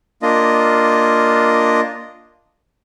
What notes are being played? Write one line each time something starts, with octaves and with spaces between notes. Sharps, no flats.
A#3 D4 F4 D#5